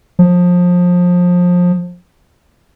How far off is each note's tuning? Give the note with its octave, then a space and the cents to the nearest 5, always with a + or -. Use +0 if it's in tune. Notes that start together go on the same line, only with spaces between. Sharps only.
F3 +25